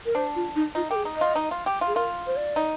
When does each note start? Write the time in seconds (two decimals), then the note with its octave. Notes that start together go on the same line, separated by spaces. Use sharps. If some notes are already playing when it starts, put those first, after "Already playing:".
0.06 A#4
0.15 D4 C5
0.36 F4
0.56 D#4
0.75 D#4 F4
0.90 G4 G#4 A#4
1.05 D#4
1.16 D#5
1.21 F4
1.36 D#4
1.51 F4
1.66 G4
1.81 F4
1.87 G#4
1.95 F4 A#4
2.27 C5
2.36 D5
2.56 D#4